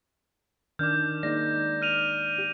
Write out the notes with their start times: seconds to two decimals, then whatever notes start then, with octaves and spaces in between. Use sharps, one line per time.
0.79 D#3 D4 D6 F6 G6
1.23 G#3 A#3 D#4 D5 A#6
1.82 F6 D#7 F7
2.38 G4